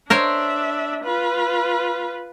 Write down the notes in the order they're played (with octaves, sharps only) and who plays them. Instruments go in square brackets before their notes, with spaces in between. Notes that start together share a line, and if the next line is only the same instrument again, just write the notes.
[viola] D4 E5 [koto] A#4 C5 C#5
[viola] F4 B4